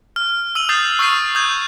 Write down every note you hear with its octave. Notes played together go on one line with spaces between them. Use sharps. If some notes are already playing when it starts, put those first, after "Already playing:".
F6
E6 D#7 F#7
D#6 G6 A6 C7
C#6 E6 G6 C7 D#7
D#6 G6 G#6